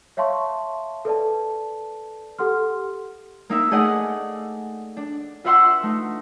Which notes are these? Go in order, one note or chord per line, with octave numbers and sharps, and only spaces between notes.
C#5 E5 F5 A5 C6 C#6
A4 B4 D5 A5
G4 A4 F#5 C6 F6
A#3 D#4 E5
A3 D#4 G#4 D5 D#5 F#5
D4
F4 B4 E5 F#5 C6 E6
A3 D#4